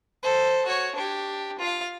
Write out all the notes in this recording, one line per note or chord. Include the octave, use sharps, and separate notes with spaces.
A4 C5
F#4 C#5
D4 G4
F4 F5